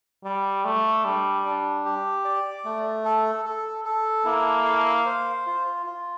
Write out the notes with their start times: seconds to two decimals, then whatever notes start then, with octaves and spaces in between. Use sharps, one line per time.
0.25 G3 D5
0.65 A3 D5
1.04 G3 D4
1.45 D4
1.85 G4
2.25 D5
2.65 A3
3.05 A4
3.45 A4
3.85 A4
4.25 A#3 E4
4.65 F5
5.06 C5
5.46 F4
5.86 F4